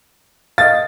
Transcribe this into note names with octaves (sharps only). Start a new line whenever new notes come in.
D#5 F5 A6